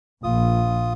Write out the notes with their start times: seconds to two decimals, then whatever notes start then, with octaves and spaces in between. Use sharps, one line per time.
0.24 A#1 F4 D#6